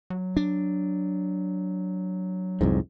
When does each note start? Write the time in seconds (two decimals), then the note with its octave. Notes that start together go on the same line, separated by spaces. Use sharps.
0.10 F#3
0.37 D4
2.61 C2 F2 G#2